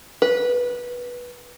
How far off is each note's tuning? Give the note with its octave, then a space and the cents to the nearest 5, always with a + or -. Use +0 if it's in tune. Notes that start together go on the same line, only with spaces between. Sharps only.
B4 -15